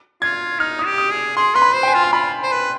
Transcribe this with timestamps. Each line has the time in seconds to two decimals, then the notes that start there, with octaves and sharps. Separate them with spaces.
0.22 F4 G#6
0.59 D#4 F6
0.79 D#6
0.86 G4
0.98 D#6
1.11 G#4
1.37 G#4 C6
1.55 B4 C6
1.62 B5
1.75 C5
1.83 G5
1.88 G#5
1.94 F4
2.03 C6
2.13 F4 B5
2.43 C5
2.52 B4